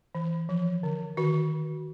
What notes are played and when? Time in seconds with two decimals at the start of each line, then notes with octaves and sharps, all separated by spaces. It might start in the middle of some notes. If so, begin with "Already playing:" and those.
0.15 E3
0.49 F3
0.83 D3
1.17 D#3 F#4